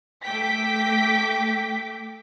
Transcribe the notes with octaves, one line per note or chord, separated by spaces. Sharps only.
A3 G5 D6 B6